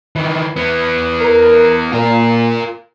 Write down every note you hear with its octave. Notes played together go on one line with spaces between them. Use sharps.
D#3 E3
E3 B3
A#4
A#2 F4 A#4